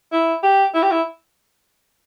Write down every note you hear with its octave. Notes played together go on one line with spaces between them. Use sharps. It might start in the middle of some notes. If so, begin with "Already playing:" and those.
E4
G4
E4
G4
E4